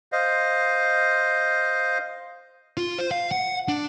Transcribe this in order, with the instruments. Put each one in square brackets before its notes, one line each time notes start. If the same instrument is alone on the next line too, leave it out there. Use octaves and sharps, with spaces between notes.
[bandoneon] C5 D#5 F5
[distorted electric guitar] F4
C5
F5
F#5
D4